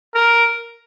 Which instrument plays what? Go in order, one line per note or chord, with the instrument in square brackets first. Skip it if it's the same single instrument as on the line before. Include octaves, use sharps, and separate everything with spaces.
[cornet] A#4